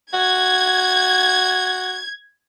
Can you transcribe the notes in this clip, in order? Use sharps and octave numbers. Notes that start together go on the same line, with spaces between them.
F#4 G#6